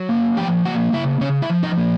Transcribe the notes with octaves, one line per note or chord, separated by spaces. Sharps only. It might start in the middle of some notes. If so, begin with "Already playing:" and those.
Already playing: F#3
A#3
F3 G4 G5
A#3 F#4 F#5
C#3 E4 E5
C#3 C#4 C#5
E4 E5
F3
D#4 D#5
A#3